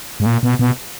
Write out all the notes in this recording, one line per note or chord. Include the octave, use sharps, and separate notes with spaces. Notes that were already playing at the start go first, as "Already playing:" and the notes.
G#2
A#2
B2
B2